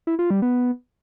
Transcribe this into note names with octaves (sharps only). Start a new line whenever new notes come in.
E4
F4
G3
B3